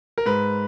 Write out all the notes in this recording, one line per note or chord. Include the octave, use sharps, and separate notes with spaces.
A#4
G#2 B4